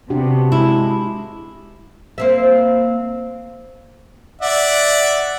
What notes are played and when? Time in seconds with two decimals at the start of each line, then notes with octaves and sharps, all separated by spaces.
0.10 C3 B3 D4 F#4 G4
0.52 G#3 E4
2.18 A#3 C4 E5
4.41 D5 E5 F#5